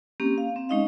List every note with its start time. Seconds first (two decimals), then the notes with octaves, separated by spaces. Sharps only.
0.20 A#3 C4 C#4 G4
0.38 F5
0.56 C4
0.69 G#3 C#4 D#4 D#5 F5